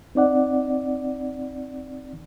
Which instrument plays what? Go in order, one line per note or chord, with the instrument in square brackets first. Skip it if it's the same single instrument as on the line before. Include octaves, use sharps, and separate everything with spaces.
[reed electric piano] C4 D#4 D5 F#5